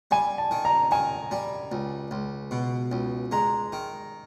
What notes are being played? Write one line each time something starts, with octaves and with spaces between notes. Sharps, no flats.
G3 G#5
A5
D#3
A#5
D#3 G#5
G3
C#2
C#2
B2
C#2
G#3 A#5
D#3